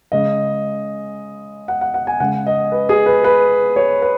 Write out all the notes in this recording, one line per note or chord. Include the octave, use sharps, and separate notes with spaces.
C#3 G#3 D#5
F#5
F#5
F#5
G#5
C#3 G#3 F#5
D#5
B4
G#4
B4
B4
C#5
B4